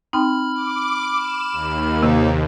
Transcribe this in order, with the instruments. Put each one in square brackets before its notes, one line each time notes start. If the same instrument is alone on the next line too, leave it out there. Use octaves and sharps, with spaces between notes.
[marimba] C4 D#4 G5 [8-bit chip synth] B5 F6
[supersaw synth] D6
E7
D#2
[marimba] C3 D#3 [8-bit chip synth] A#3 D#4